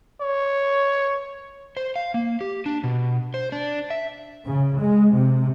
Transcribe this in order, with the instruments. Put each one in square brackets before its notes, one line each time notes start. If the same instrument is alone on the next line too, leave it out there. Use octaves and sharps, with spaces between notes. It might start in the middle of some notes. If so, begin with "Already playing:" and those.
[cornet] C#5
[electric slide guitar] C5
F5
A#3
G4
D4
B2
C5
D4
E5
[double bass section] C#3
G#3
C3